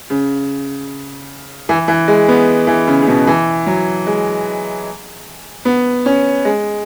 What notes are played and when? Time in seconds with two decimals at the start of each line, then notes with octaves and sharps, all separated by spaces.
0.10 C#3
1.69 E3
1.88 E3
2.08 G#3
2.28 B3
2.67 E3
2.87 C#3
3.02 C#3
3.08 B2
3.27 E3
3.66 F#3
4.07 G#3
5.65 B3
6.06 C#4
6.45 G#3